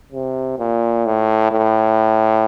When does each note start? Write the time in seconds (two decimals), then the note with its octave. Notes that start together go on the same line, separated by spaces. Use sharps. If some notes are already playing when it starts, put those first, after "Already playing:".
0.12 C3
0.59 A#2
1.06 A2
1.51 A2